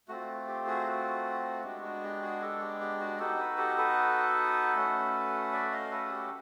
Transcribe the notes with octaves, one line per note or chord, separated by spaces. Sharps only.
A3 C4 F4 F#4
G4
F#4 G#4
F#4
G#3 B3 D4 F#4 G4
F#4
G4
F#4 G#4
G4 A4
G4
G4
F#4
B3 D#4 F#4 G4 A4
A4 B4
G4 A4
A4 B4
A3 C#4 F#4
D5 E5
D#5 F5
A4 B4
G#4
G4 A4